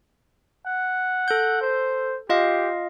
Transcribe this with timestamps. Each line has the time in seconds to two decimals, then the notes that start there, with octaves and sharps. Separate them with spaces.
0.66 F#5
1.28 A4 G6
1.61 C5
2.30 F4 G4 D#5 F5